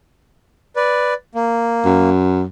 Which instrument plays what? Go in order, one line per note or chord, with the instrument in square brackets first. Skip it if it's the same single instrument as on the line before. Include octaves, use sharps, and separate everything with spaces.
[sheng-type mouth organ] B4 D5
A#3
[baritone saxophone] F#2